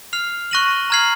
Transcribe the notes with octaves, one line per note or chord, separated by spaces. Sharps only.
F6 C7 F7
C#6 F#6 A#6 D#7 F#7
A#5 F6 G#6 C7 F#7